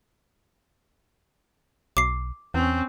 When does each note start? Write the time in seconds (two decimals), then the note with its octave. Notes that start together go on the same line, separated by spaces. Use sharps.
1.97 B1 D6 C7
2.54 E2 C4 C#4